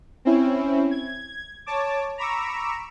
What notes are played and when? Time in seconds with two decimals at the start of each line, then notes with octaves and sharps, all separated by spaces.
0.25 C4 C#4 E4
0.91 G#6
1.66 C#5 A5 D6
2.18 A#5 B5 C#6 D6 E6